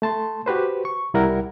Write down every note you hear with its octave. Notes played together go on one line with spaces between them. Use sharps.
A3 A5 C6
F#4 G4 B4 C5
C#6
C2 G3 E4 A#4 F#5